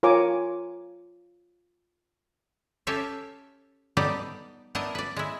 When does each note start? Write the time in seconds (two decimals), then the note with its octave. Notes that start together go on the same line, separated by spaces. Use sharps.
0.03 F4 A#4 C#5 G#5 D6
2.87 C#4 G4 A4 E5 F5
3.97 G3 B3 D#4 G4 A4 D5
4.75 B3 D4 E4 A#4 D#5
4.95 B4 D5
5.16 G#3 E4